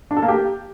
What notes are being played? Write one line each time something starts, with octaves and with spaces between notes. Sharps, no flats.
D4
A4
A#3
G4